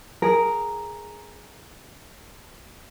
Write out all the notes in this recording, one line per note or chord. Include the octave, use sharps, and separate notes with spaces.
G#4 A#4